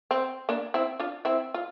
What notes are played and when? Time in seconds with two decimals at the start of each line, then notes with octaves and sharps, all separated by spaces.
0.11 C4
0.49 A#3 D4
0.74 C4 E4
0.99 D4 F4
1.25 C4 E4
1.54 F4